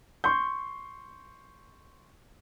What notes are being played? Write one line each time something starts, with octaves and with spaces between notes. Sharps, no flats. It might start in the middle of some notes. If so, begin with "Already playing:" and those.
C6 C#6 G6